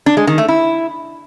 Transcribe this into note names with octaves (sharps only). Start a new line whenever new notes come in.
D4
G#3
D#3
A3
E4